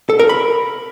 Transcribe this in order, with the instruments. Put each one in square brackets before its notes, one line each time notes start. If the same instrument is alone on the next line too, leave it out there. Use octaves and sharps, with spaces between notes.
[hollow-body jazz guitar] A4
A#4
B5